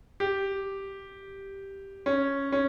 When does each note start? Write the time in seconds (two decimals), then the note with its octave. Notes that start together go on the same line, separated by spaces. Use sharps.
0.20 G4
2.06 C#4
2.52 C#4